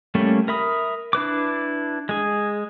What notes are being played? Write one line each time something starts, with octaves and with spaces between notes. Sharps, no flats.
G3 A3 A#3 C#4
A#4 E5 B5 D#6
D4 E4 B4 D6
G#3 G#4